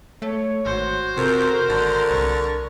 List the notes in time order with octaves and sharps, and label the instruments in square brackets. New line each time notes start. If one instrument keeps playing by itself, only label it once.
[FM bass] A3 [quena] C#5
[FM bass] G#1 [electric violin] F#4 C5
[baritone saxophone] F2 [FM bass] C3 [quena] A#4
[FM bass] G#1 [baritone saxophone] D3
[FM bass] C2 [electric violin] C#6